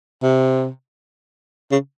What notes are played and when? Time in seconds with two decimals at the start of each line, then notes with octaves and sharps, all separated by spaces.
0.23 C3
1.72 C#3